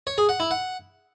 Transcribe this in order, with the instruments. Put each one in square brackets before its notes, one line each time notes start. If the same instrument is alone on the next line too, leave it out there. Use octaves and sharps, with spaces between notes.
[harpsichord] C#5
G#4
F#5
E4
F#5